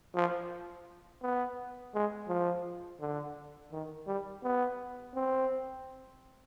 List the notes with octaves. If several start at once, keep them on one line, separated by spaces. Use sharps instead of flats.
F3
B3
G#3
F3
D3
D#3
G3
B3
C4